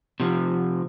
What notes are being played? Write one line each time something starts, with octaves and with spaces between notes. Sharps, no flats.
C3 F3